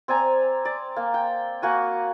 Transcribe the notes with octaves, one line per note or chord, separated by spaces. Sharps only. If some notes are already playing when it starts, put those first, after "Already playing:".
C4 D5 G#5 A#5
D5
A#3
G5
A#3 F#4 G#5